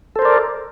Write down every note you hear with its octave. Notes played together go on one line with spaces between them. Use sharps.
A4 A#4 C5 D5